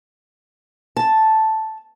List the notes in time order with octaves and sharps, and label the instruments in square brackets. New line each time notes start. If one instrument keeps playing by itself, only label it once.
[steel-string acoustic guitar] A5